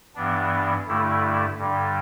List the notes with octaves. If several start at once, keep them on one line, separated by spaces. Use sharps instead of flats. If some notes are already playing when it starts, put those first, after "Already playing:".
G2 E3 B3 D4
G2 D3 A3 E4
G2 D3 G3